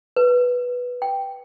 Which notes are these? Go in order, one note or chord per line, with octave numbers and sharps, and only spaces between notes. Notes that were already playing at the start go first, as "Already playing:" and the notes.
B4
G5